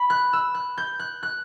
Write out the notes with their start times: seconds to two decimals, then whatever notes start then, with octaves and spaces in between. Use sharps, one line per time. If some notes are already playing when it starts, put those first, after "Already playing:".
Already playing: B5
0.10 F#6
0.33 E6
0.55 F#6
0.78 G6
0.99 F#6
1.23 F#6